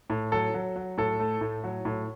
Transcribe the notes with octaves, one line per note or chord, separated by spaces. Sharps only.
A2
F#3 A4
F#3
F#3
A2 A4
A3
A2
F#3
A2